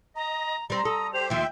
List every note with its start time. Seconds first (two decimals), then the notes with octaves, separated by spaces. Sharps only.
0.16 D#5 A#5
0.70 G3 C4 A#5
0.85 A4 D#6
1.13 G4 C5 F7
1.30 D#2 F3 E5 G5 C6